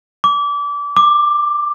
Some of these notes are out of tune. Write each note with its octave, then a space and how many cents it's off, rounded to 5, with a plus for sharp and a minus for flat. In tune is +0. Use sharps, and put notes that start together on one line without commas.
D6 -25
D6 +10